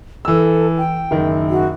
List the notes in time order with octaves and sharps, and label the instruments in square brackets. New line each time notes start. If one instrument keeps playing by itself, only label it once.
[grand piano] E3 E6 [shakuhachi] A4
[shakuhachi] G5
[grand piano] F#1 D#3
[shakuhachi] F#4